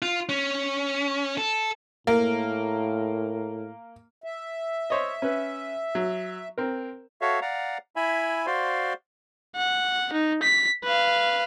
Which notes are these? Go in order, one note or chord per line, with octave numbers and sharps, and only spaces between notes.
F4
C#4
A4
A2 A#3
E5
C5 C#5 D#5
C#4 B4
F#3
C4 A#4
F#4 A4 C#5 E5 F5
D5 F5 F#5 A#5
E4 E5 G#5 B5
F#4 C5 D5 F5 C6
F#5
D#4
B6
B4 F5